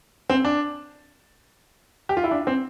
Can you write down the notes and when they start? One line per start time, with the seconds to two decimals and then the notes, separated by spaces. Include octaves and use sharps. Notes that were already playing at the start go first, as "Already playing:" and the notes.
0.30 C4
0.45 D4
2.09 G4
2.17 F4
2.24 E4
2.31 D4
2.47 C4